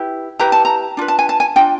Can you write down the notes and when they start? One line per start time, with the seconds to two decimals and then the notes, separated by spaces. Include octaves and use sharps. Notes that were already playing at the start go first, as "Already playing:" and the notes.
Already playing: E4 G4 B4
0.39 E4 G4 B4 A#5
0.52 A5
0.65 A#5
0.97 D4 F4 B4
1.08 A5
1.19 G#5
1.29 A5
1.40 G#5
1.56 D4 F4 G5